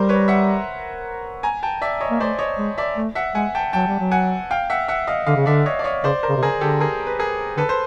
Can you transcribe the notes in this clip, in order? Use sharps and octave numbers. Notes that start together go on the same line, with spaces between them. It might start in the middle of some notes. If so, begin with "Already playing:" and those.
Already playing: G3 A#4 C5
B4 C#5
E5 F#5
G#5 A#5
G5 A5
D5 E5
C#5 D#5
A#3
A3 C5 D5
C#5 D#5
G#3
D5 E5
A3
E5 F#5
G#3 F#5 G#5
G5 A5
F#3 G5 A5
G3
F#3
F#5 G#5
F5 G5
E5 F#5
E5 F#5
D#5 F5
D3 D#5 F5
C#3
D3 D5 E5
C#5 D#5
D5
C#5 D#5
C#3 C5 D5
A#4 C5
C#3
C3
C#3 G#4 A#4
D3
G4 A4
G#4 A#4
B4
G#4 A#4
D3 A4 B4
C5